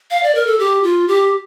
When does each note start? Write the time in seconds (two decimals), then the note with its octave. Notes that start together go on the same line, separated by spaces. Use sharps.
0.11 F5
0.23 D5
0.35 A#4
0.47 A4
0.60 G4
0.83 F4
1.08 G4